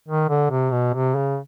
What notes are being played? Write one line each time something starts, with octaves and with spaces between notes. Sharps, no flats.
D#3
D3
C3
B2
C3
C#3